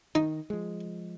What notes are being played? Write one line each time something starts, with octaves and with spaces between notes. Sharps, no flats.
D#3 D#4
F3 G#3